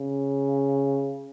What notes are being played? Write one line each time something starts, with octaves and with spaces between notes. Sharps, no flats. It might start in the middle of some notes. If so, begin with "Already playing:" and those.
Already playing: C#3